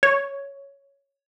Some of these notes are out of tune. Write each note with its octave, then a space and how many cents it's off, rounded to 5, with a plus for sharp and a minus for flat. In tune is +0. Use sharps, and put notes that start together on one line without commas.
C#5 +5